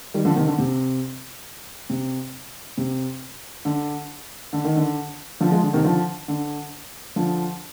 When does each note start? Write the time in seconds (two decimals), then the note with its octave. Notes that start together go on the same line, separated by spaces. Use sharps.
0.14 D#3 G3
0.25 D3 F3
0.36 C3 D#3
0.47 D3
0.58 C3
1.89 C3
2.77 C3
3.65 D3
4.53 D3
4.64 D#3
4.76 D3
5.40 D3 F3
5.51 F3 G#3
5.63 D3
5.73 C3 D#3
5.84 D3 F3
6.28 D3
7.16 D3 F3